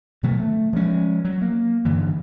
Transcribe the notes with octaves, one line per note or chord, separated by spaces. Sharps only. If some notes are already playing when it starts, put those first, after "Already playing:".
B2 D#3 F#3 A3
A3
F3 G#3 C#4
F#3
A#3
G2 D3 E3